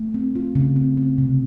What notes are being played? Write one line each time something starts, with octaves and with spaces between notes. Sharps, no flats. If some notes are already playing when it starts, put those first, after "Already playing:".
Already playing: A3
C4
F4
C#3
C4
C4
C3